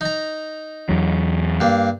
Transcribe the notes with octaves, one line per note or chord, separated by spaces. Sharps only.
D#4 A#5
E2 F#3
G2 A#3